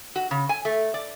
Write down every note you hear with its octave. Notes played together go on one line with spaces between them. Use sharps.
F#4
C#3
G#5
A3
D5